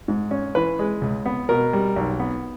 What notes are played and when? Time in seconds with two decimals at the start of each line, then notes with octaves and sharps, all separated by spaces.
0.08 G#2
0.31 C#4
0.55 E3 B4
0.79 G#3
1.01 C#2
1.26 B3
1.49 B2 A#4
1.73 G3
1.96 B1
2.20 B3